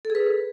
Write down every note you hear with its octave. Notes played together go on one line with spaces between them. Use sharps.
A4
G#4
B4